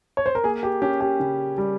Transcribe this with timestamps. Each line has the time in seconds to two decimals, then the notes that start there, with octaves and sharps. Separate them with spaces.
0.17 C#5
0.26 C5
0.35 A#4
0.44 A#3 G#4
0.63 G4
0.82 C#4 G4
1.01 G4
1.20 C#3
1.58 G3